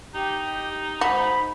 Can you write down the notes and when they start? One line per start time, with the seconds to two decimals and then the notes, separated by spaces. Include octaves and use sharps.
0.15 D#4 G4
1.01 G#2 F#4 B5